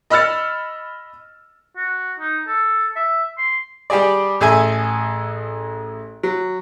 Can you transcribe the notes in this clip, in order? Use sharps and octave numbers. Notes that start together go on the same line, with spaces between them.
D#5 B5 E6 F6 A6 C#7
F#4
D#4
A4
E5
C6
G3 G4 G#4 D5
A1 G#4 A4 E5 G#5
F#3